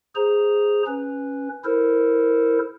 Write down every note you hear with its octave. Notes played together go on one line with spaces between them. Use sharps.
G#4 C5 A#5
C#4 B4
E4 A4 A#4 C5